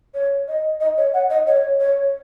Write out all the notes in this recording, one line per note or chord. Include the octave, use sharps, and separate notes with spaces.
C#5
D#5
D#5
C#5
F#5
D#5
C#5
C#5